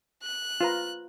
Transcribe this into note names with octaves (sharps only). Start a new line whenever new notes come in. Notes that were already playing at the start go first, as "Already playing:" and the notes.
F#6
F4 B4 A#5